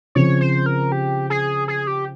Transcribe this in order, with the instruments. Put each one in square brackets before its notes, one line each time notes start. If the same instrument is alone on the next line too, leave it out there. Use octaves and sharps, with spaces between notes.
[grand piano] C#3 F3 C4 [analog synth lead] C#5
[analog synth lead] C5
A#4
G4
G#4
G#4
G4